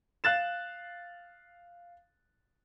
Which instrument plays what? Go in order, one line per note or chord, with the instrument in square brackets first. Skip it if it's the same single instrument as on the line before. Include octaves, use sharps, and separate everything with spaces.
[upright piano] F5 F#6 A6 E7